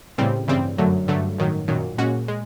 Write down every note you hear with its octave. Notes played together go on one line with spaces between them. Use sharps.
A2 C#3 E3 G3 C4
G2 C#3 E3 G3 C4
F#2 D3 F#3 A3
G2 D3 F#3 A3
F#2 A2 D#3 F#3
F#2 A#2 D#3 F#3
A#2 G#3 C#4 F#4
G#3